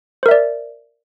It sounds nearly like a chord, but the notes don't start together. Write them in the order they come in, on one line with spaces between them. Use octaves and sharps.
C5 A#4 E5 D5